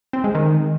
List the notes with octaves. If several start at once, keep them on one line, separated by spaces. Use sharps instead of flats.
C4
G#3
D#3